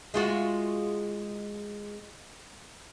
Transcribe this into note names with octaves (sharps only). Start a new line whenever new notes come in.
G#3 F4 F#4